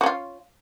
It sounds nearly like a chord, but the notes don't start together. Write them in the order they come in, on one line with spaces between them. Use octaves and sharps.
F#4 C#4 F4